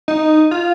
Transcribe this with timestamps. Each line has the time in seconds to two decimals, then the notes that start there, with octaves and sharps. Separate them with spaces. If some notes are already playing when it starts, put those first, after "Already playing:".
0.08 D#4
0.51 F4